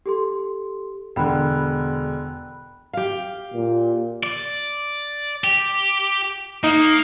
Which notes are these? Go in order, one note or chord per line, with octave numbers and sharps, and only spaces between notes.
G4 A4 C6
E1 D3 G5 B5 F#6
G4 F5
A#2
D5
G4
A#3 D#4